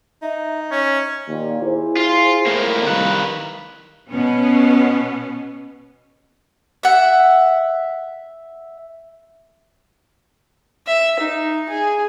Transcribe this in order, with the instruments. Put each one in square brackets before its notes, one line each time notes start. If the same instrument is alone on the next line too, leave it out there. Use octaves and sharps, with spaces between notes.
[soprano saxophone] D#4 [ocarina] E5
[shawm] C#4 [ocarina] C#5
[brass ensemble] D#2 A#2
E4 G#4 C5
[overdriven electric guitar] F4
A2 A#3
[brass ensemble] C2 D#5 F5 [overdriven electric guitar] D#3 B4
[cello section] B2 B3 C#4
[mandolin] E5 F#5
[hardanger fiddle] E5
D#4
G#4